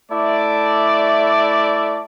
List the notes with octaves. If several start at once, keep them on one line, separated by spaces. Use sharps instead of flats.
A3 E4 D5